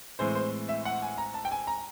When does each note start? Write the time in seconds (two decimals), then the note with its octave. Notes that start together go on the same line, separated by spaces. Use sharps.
0.19 A2 E3 G#3 C4 C5
0.35 C5
0.69 E5
0.85 F#5
1.02 G#5
1.18 A#5
1.34 A5
1.45 G5
1.51 G#5
1.67 A#5